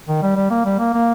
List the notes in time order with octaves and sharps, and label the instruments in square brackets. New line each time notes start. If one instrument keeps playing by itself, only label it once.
[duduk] D#3
G3
G3
A#3
G3
A#3
A#3